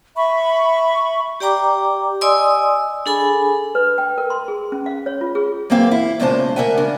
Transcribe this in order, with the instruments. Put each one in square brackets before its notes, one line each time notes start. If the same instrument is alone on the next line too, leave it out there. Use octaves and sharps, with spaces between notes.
[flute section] E5 B5 C#6
[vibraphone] G4 D5 G5 A#5 D6
D5 D#5 G#5 C6 D#6 E6
D4 G#4 A4 G#5 B5
[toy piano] B4
G5
A#4
C6
G#4
C#4
F5
C#5
F4
G#4
[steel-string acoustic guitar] F#2 E3 A#3 C4 F5
E4
E2 A#2 C#3 G#3 C5 A5
D2 G#3 A#4 E5 F#5 G#5
C#3 D4